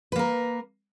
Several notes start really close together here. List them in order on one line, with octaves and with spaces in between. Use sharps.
B4 A#3 A#4